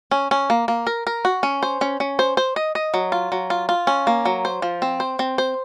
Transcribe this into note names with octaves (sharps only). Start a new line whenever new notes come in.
C#4
C#4
A#3
A#3
A#4
A#4
F#4
C#4
C5
C#4
C#4
C5
C5
D#5
D#5
F#3
F4
F#3
F4
F4
C#4
A#3
F#3
C5
F3
C4
C5
C4
C5